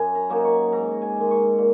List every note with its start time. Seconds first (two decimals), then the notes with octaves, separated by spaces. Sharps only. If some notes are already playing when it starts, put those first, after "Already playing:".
Already playing: F#2 G#5
0.15 A#5
0.30 F#3 A#3 D#4
0.45 C#6
0.72 G#2 A#5
1.02 G#5
1.16 D#3 G#3
1.31 C#6
1.59 A#2